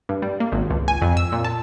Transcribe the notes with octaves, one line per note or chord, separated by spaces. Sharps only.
G2
G3
A#3
G#1
C#2
G#5
F2
E6
A#2
A5